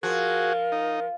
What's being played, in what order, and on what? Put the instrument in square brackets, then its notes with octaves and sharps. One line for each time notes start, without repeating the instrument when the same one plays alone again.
[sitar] F3 [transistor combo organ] F#4 G#4 [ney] A#4
[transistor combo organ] D#4